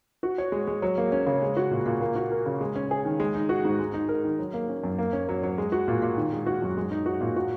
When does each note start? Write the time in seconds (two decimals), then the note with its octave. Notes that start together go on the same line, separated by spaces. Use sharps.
0.23 F#4
0.38 C#5
0.52 G#3
0.67 G#3
0.82 F#3
0.98 A#3
1.12 C#4
1.27 C#3
1.42 G#3
1.57 F#4
1.71 A#2
1.86 A#2
2.01 A#3
2.15 F#4
2.32 A#4
2.46 C#3
2.61 G#3
2.76 C#4
2.91 G#4
3.05 D#3
3.20 G#3
3.34 D#4
3.49 F#4
3.65 G#2
3.79 G#3
3.94 D#4
4.09 A#4
4.24 D#3
4.39 F#3
4.54 A#3
4.69 C#4
4.84 F#2
4.98 A#3
5.13 C#4
5.29 F#3
5.43 F#3
5.58 G#3
5.72 F#4
5.88 A#2
6.02 A#2
6.17 D#3
6.33 G#3
6.46 F#4
6.62 F#2
6.77 G#3
6.91 D#4
7.06 F#4
7.21 A#2
7.36 F#4